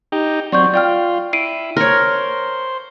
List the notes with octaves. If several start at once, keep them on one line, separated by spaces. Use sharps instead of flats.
D#4 G4
F#3 C4 D5 C#6 G6
F4 D5 G5 F6
E4 C7 D7 D#7
A#4 C5 C#5